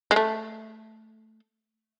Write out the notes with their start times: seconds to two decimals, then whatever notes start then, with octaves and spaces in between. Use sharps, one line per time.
0.11 G#3
0.16 A3